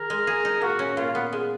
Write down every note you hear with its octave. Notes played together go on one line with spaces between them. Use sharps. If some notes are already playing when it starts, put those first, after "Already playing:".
Already playing: D#3 G#4 A#4
G#3
G#4
D#4
A#2 F#4
C#4
A#2 F4
B3
G#3